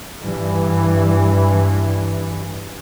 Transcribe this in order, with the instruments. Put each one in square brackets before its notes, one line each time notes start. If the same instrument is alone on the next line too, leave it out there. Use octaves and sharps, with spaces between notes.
[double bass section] G2 E3